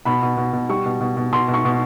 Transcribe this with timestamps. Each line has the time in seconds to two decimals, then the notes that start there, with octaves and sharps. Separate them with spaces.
0.05 B2 B5
0.22 B2
0.37 B2
0.53 B2
0.69 G3 C#6
0.85 B2
1.00 B2
1.16 B2
1.32 B2 C6
1.48 B2
1.54 C#6
1.65 B2